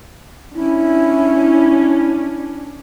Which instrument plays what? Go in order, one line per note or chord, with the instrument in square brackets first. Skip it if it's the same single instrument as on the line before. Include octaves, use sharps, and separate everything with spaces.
[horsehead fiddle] C#4 D4 [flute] E4